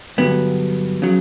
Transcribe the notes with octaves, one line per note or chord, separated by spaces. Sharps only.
G2 D3 F#3 B3
C#3 F#3